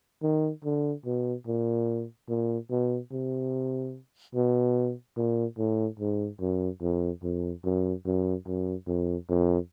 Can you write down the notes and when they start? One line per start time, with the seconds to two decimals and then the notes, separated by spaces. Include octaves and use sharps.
0.23 D#3
0.64 D3
1.06 B2
1.47 A#2
2.29 A#2
2.71 B2
3.12 C3
4.35 B2
5.17 A#2
5.58 A2
6.00 G#2
6.41 F#2
6.82 F2
7.23 F2
7.65 F#2
8.06 F#2
8.46 F#2
8.88 F2
9.29 F2